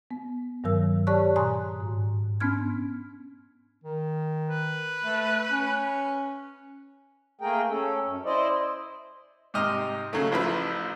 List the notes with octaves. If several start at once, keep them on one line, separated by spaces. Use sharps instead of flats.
B3
G2 D#3 F#3 A#4 E6
G4 C#5 D5 A5 C#6 F#6
A#2 G#5 A#5 C6 D#6 F#6
G#2
B3 C#4 D4 F6 G#6
D#3
B4
A3
C#4
A3 A#3 G#4 A#4 G5
C#4 A4
F#2
E4 C5 D5 D#5
G#2 C3 D#5 F6
C#3 F#3 A3
A1 F3 E4 B4